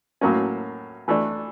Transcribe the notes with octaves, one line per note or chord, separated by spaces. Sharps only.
A2 F#3 A#3 C#4
E3 A3 D4